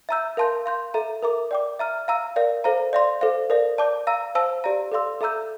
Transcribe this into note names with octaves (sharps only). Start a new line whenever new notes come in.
E5 A#5 E6 G6
A#4 F5 A5 C6 G6
F5 C6 G6
A4 E5 A#5
A#4 E5 A#5 D6
D5 G5 D6
E5 A#5 F6
F5 A#5 E6
A#4 D5 F5
A4 C5 F5 A#5
D5 F5 C6
A4 C5 F5
A#4 D5 F5
D5 A5 D6 G6
F5 A#5 E6
C5 F5 A5 E6
G4 D5 F5 A#5
A4 D5 F5 C6 E6
A4 E5 A#5 E6 G6